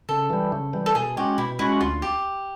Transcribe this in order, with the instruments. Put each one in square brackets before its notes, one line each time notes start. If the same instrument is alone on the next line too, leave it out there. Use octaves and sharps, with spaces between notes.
[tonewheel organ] C#3 [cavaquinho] A4
[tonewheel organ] E3 G3
C#3
E3 G3
[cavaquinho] A4
[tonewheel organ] B2 [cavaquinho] G#4
[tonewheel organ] G#3 C#4 F#4 [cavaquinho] G4
[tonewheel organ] B2 [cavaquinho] E4
[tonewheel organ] G#3 C#4 F#4 [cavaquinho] E4
[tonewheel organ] D2 [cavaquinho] F4
[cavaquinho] G4